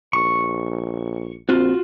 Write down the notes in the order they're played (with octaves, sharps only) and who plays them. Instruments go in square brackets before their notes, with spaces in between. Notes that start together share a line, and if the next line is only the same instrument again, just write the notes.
[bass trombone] A#1 [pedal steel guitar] C#6
[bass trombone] A#1 [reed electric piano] C4 [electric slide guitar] F4 F#4